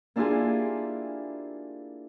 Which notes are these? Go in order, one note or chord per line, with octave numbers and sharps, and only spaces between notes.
A#3 D4 E4 F4 G4 G#4